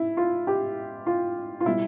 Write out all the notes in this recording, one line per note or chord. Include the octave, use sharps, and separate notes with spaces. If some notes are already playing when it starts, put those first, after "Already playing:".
Already playing: E4
F4
G4
F4
F4
B2 G3 B3 E4